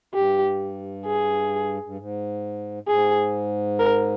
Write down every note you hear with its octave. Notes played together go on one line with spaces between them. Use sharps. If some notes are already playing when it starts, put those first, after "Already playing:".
G2 G4
G#4
G2
G#2
G#2 G#4
A#4